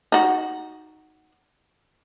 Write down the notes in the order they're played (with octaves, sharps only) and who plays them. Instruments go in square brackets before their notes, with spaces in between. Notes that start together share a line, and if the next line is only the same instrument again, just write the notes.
[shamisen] D#4 F#4